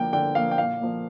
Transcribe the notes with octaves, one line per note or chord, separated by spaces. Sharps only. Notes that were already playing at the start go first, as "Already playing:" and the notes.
Already playing: D3 F3 A#3 G5
D3 G5
F3 A#3 F5
G5
A#2 F5
F3 A#3